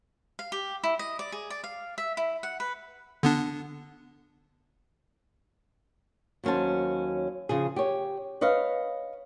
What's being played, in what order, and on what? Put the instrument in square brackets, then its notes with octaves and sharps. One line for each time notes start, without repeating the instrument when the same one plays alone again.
[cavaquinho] F5
G4
E4
D#5
D5
G#4
D5
F5
E5
E4
F#5
B4
[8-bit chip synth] D3 B3 D4
[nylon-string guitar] D#2 F#3 C#4 C5 A5
C#3 F3 G#4
G4 C#5
B4 C#5 D#5 F5